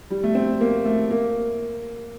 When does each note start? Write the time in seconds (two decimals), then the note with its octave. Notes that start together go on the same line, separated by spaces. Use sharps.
0.10 G3
0.23 A3
0.35 C4
0.61 A#3
0.85 A3
1.10 A#3